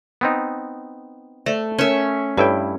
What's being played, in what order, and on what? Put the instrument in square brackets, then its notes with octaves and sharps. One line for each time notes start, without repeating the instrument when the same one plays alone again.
[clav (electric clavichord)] B3 C4 D#4
[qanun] A3 [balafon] C5 D5 E5
[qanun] C#4 E5 [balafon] A#4 C#5
[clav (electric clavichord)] G2 E4 G5 [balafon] A4 B4 C#5